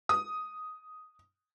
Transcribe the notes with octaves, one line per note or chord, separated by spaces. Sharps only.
D#6